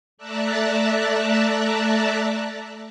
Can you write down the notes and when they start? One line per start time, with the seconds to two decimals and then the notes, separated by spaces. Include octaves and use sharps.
0.17 A3 D5 E5 A5 A#5 F#6